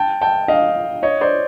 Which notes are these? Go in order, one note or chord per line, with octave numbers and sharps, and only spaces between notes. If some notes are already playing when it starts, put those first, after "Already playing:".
Already playing: G5 A5
G5 A5
D#5 F5
C#5 D#5
C5 D5